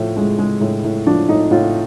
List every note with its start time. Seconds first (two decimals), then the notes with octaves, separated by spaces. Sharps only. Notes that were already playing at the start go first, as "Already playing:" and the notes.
Already playing: A2 F3 E4
0.17 G#3
0.38 G#3
0.61 A2
0.84 A2
1.07 F3 D4
1.29 A2 D#4
1.51 A2 F4